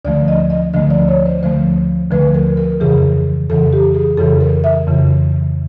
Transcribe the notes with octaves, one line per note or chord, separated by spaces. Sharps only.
D2 D3 F3 A3 D5
D#5
D#5
D2 D3 F3 A3 D#5
D5
C#5
C5
D2 D3 F3 A3 C5
D2 D3 F3 A3 B4
A#4
A#4
F2 C#3 E3 G#4
F2 C#3 E3 A4
G4
G#4
F2 C#3 E3 A4
A#4
E5
F2 C#3 E3